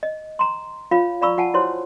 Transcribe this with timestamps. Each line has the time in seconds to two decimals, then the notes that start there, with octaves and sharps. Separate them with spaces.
0.03 D#5
0.39 A#5 C6
0.91 F4 C#5 F5 B5
1.21 D5 F5 A#5 B5 C#6 E6
1.38 F4 F#5 G#5 A5
1.54 E4 F#4 C5 C#5 C6